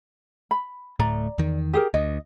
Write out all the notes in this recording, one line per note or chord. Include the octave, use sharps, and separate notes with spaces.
B5
D1 A2 A3 D5 A#5
E2 D#3
G4 G#4 A#4
D2 D#5